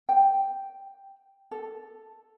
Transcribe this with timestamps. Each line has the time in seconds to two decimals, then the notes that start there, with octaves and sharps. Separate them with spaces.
0.09 G5
1.51 A4